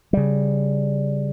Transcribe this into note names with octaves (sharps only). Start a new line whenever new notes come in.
C#3 G3